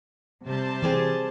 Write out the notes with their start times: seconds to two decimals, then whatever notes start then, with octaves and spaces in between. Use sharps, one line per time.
0.46 C3 G3 C5 A5
0.82 E3 C4 G#4 D5